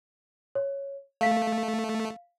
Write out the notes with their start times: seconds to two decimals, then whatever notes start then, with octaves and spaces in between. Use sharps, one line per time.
0.55 C#5
1.21 A3 F5 B6